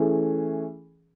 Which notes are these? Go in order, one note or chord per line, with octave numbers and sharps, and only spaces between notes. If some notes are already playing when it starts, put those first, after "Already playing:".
Already playing: E3 A3 C#4 G#4